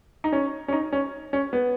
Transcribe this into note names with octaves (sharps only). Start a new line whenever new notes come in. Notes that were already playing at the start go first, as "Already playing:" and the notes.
D#4
C#4
C#4
D#4
C#4
C#4
B3